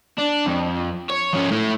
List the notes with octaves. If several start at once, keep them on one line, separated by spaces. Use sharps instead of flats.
D4
F2
C#5
F3 C#4
A3 E4